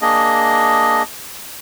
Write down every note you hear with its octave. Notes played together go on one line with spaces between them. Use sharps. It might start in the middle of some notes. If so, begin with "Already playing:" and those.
A#3 D4 G#4 D#5